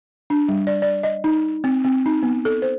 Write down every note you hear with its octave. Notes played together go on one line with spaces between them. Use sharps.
D4
G3
D5
D5
D#5
D#4
C4
C4
D#4
B3
A4
C5